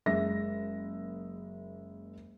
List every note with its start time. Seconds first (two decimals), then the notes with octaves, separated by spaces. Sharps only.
0.06 F#1 G#3 E5 A#6